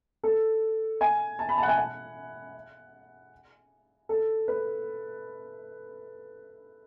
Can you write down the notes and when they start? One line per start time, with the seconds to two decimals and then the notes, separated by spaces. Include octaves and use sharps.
0.23 A4
1.01 G#5
1.39 A5
1.49 B5
1.58 A5
1.63 F#5
1.68 G#5
1.77 F#5
4.09 A4
4.48 B4